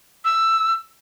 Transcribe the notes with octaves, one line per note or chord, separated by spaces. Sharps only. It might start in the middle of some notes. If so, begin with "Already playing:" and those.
E6